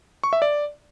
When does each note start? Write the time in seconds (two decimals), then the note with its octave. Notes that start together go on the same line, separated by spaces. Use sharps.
0.24 C#6
0.33 E5
0.42 D5